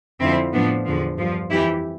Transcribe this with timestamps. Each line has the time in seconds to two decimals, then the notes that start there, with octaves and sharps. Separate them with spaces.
0.20 F2 D3 F3 C4 E4
0.53 A2 F3 B3 D4
0.86 E2 D3 F3
1.18 G2 F3
1.50 F2 E3 E4 G4